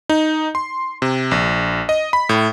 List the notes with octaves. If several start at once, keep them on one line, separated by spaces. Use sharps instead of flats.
D#4
C6
C3
A#1
D#5
B5
A2